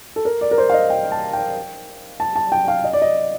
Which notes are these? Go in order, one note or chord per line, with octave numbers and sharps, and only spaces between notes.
A4
A#4
D5
A#4
C5
F5
D#5
G5
A5
G5
A5
A5
G5
F5
D#5
D5
D#5